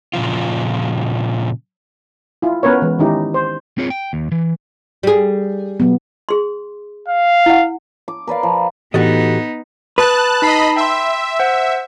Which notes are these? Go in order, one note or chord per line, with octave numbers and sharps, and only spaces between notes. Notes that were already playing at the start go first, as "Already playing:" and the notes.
A#2 C#3 F3 F4
E4 F4
B3 C#4 A#4 B4 C#5
E3 G#3 C#5
D#3 G#3 C#4 D#4 E4 G4
C5
C4 F4 G#4 C#5
G5
D#2
E3
G3 G#4
B2 F#3 B3
G#4 C6
F5
E4 F#5
D6
A#4 B4 D5 F5
F3
A2 E3 B3 D#4 F#4 G4 A4 D#5
B4 A5 D#6 F#6
D#4 D#5 A5 B5 C7
E5 G5 C6
C5 F#5